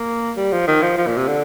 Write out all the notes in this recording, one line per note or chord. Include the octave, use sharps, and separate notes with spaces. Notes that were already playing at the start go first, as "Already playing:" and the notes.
Already playing: A#3
G3
F3
D#3
F3
F3
A#2
C3
D3